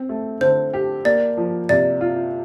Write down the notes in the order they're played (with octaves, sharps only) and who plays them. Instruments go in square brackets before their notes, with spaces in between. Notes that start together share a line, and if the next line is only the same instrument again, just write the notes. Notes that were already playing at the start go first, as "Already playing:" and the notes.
Already playing: [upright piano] C4
A3
[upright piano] D3 [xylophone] C5
[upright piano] G4
[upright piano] A#3 [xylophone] D5
[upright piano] F3
[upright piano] C3 [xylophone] D5
[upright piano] F4